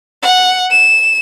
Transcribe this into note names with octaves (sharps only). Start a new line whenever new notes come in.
F#5
E7